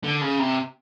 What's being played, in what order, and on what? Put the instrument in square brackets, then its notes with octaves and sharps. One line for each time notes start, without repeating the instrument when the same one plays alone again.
[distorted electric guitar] D3
C#3
C3